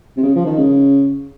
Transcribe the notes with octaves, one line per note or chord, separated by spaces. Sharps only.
C3
C#3
F3
D#3
C#3